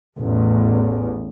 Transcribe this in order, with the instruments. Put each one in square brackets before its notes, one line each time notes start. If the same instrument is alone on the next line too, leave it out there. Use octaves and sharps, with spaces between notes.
[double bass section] A1 E2